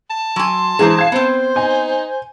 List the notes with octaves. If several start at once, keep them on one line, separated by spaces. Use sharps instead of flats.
A5
F#3 G#5 C6
E3 G#3 G#4 C5 A#5
F5 G#6 C7
B3 C4 C5
D#4 G#5